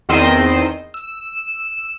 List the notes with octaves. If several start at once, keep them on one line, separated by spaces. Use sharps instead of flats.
E2 D#3 C4 C5 D#5 C6
E6